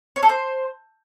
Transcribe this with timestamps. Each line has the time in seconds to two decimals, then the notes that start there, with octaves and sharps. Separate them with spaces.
0.16 C#5
0.23 A4
0.29 C5